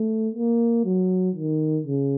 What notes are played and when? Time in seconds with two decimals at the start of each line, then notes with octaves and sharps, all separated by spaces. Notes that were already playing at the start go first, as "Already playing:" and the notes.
Already playing: A3
0.35 A#3
0.85 F#3
1.36 D#3
1.87 C#3